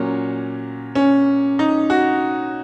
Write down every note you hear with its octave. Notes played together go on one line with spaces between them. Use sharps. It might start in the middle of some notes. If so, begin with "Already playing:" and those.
Already playing: A#2 F#3 A#3 C#4
C#4
D#4
F#4